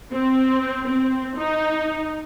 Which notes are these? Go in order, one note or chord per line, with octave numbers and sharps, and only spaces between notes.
C4
C4
D#4